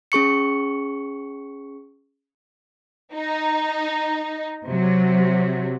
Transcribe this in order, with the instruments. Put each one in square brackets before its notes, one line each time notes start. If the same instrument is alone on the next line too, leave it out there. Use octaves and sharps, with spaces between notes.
[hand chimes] C#4 G#4 C#6 C#7
[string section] D#4
C3 F#3